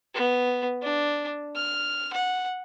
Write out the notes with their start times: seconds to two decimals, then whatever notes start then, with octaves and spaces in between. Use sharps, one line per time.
0.14 B3
0.82 D4
1.56 F6
2.13 F#5